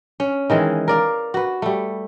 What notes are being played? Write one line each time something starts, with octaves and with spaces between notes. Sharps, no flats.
C#4
D#3 E3 G#3
A#4 D5 F5
F#4 B4
G3 A3